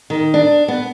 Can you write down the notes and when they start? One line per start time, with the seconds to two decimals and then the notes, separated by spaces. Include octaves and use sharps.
0.10 D#3
0.34 D4
0.68 B3